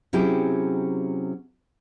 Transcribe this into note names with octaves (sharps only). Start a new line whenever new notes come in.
C3 F#3 C#4 E4 G4 G#4